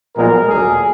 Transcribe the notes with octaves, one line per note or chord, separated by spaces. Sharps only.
B1 A#2 F3 G#3 B3 A#4
D2 D3 F#3 G#4